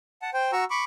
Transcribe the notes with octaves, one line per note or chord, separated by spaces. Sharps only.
F#5 A5
C5 G5
F#4 A#5 C#6 E6
B5 C#6 D6